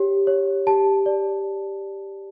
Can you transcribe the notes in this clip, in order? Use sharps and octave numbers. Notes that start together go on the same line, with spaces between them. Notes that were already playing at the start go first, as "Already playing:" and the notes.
Already playing: G4 C#5
C#5
G4 A5
D5